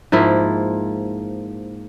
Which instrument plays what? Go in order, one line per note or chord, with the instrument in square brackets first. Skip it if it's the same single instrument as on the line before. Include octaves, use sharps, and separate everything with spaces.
[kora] G#2 F3 A#3 E4